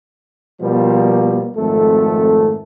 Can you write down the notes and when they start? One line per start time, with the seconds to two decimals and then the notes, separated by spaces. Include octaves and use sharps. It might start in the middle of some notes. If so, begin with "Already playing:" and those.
0.60 B2 F3 G3 A#3
1.56 G#1 F2 A3 A4